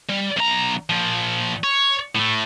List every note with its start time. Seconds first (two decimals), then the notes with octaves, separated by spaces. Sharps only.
0.10 G3
0.37 B1 A#5
0.89 A#2 F3
1.64 C#5
2.15 A2 A3